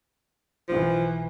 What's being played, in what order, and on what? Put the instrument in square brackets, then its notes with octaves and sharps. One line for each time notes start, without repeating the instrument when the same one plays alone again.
[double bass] B1 E3 [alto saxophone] F3